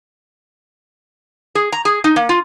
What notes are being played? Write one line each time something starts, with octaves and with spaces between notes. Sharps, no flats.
G#4
A#5
G#4
D#4
A#3
F4